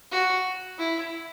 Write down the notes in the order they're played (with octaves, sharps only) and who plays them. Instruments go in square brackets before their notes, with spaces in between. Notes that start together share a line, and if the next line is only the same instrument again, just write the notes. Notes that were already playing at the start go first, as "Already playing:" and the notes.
[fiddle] F#4
E4